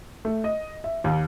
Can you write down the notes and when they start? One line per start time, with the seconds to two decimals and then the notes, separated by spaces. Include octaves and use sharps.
0.25 A3
0.44 D#5
0.84 E5
1.04 D#2